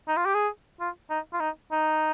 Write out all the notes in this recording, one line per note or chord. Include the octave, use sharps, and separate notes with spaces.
D#4
F4
G4
G#4
F4
D#4
F4
D#4
D#4